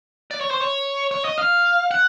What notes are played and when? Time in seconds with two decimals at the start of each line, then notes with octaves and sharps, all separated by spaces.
0.31 D5
0.41 C#5
0.51 C5
0.61 C#5
1.11 C#5
1.25 D#5
1.38 F5
1.91 F#5